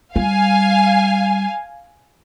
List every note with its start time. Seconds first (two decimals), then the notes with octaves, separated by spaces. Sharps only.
0.16 G3 F5 G#5